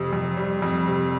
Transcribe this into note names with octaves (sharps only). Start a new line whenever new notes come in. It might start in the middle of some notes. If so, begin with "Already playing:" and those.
Already playing: F2 C3
F2
G3
F2
C3